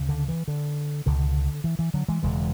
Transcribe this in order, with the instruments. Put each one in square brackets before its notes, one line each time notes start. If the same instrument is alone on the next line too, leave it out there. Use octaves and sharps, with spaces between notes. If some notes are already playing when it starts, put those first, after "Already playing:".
Already playing: [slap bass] D2 C#3
D3
E3
D3
C#2 B2 D3
E3
E3
D3 F#3
E3 G#3
E1 E2 C#3 E3 G#3